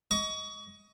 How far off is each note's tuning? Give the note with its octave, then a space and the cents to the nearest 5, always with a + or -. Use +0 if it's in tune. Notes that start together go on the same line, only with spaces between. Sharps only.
D#5 +15 C#6 +30